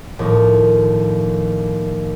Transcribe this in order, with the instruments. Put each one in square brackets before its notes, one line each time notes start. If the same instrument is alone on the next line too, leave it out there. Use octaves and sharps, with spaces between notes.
[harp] D#2 A2 F3